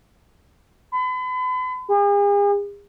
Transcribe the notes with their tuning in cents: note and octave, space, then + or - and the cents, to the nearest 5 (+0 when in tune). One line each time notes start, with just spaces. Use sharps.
B5 +40
G#4 -45